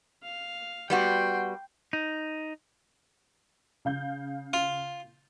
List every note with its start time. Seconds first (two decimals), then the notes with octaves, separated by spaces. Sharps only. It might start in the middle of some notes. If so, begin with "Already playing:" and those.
0.23 F5
0.90 G3 B3 F#4 G5 C6
1.93 D#4
3.85 C#3 F5 G6
4.53 F4